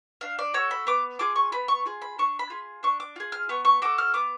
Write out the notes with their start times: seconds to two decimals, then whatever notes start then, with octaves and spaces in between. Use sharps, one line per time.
0.21 D4 F5
0.39 D5
0.54 F#4 A4 C#5
0.71 B5
0.87 B3 D6
1.19 F4 G#4 D6
1.36 C#6
1.52 B3 B5
1.68 C#6
1.86 F4 G#4
2.02 B5
2.18 D4 C#6
2.39 B5
2.50 F4 G#4
2.83 D4 C#6
3.00 D6
3.16 F4 G#4
3.32 F6
3.49 B3 C#6
3.65 C#6
3.82 F#4 A4 D6
3.98 F6
4.14 B3 D6